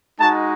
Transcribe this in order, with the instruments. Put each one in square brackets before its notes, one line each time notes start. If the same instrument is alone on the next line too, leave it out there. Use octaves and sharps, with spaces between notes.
[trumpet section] G#3 D#4 F#4 A5